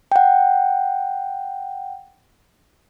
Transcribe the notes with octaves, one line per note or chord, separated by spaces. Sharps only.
F#5 G5